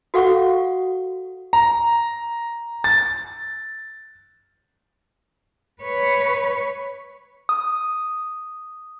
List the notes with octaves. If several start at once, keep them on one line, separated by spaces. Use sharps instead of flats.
F#4 A4 F5 F#5 C#6
A#5
A6
B4 C#5
D#6